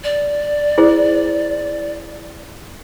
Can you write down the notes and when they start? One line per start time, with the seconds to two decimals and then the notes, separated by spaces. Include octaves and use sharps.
0.04 D5
0.78 E4 G#4 C5